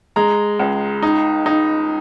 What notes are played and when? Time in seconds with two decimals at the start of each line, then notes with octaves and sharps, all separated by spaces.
0.16 G#3 A#5
0.60 C#2
1.02 D#4
1.46 D#4